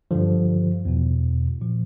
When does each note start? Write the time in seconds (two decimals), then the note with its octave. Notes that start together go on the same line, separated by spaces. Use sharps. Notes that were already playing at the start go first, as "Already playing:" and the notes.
0.11 G2 D3 F3
0.85 E2 B2
1.61 A#2 F3